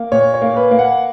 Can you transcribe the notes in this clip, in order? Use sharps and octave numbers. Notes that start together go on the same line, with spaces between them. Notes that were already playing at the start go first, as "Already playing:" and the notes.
Already playing: A#3
A#2 C#5
C#5
A#3
B4
A#3
F#5